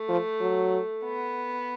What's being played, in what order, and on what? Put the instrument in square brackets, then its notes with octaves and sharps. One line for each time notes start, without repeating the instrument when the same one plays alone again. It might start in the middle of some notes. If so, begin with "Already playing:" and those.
Already playing: [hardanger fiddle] A3
[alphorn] F3
F#3
[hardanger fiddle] B3